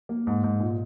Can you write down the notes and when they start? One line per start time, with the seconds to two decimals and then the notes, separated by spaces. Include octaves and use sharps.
0.09 A#3
0.27 G#2
0.44 G#2
0.60 A#2